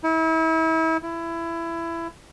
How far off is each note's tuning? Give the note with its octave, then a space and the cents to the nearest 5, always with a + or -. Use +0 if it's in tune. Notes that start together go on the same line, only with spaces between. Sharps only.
E4 -35
E4 +20